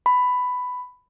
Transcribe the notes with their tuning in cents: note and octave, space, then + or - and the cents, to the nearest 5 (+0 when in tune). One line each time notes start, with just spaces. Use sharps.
B5 +10